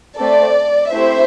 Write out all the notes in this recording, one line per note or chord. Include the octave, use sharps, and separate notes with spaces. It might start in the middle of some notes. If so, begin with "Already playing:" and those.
A3 C4 A4 D5
A3 C4 E4 G4 C5 E5